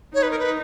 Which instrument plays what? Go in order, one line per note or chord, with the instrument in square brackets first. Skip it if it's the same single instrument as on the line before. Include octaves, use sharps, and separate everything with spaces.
[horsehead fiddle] D#4 [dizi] C#5
[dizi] B4
A#4
B4